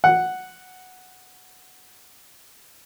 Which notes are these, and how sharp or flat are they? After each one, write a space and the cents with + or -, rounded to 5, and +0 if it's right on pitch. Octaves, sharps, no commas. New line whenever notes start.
F#5 +0